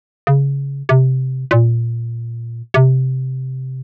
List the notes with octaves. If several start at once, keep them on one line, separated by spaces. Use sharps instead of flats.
C#3
C3
A#2
C3